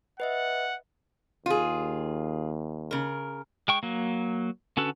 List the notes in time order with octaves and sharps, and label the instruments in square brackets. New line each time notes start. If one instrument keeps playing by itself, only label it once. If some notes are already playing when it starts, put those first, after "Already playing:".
[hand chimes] B4 D#5 E5 [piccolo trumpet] F#5
[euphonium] D#2 [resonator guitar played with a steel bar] F4 G#4
[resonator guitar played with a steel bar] C#3 A#4
[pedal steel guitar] G#3 G5 C#6
F#3 A#3
D3 C#4 F#4 A4 B4